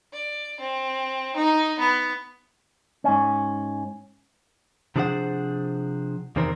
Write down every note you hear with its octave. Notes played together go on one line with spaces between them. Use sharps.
D5
C4
D#4
B3
G#2 C#4
C3 F3 D4 G#4 C5 F#5
E2 C3 D#3 C4 A#4